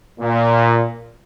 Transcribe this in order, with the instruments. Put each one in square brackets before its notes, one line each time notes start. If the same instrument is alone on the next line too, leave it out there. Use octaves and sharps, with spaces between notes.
[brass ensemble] A#2